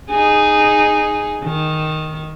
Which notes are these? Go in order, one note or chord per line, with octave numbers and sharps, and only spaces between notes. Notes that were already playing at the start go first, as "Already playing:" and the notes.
D#4 G#4
D#3